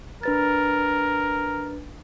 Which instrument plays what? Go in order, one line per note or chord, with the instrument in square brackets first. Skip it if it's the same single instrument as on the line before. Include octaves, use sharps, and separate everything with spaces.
[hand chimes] D4 B4 A6 [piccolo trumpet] A#4